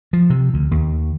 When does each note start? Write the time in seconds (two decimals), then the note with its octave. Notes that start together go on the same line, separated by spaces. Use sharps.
0.13 F3
0.30 C3
0.54 D2
0.71 D#2